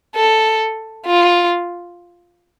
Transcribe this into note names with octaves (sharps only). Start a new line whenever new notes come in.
A4
F4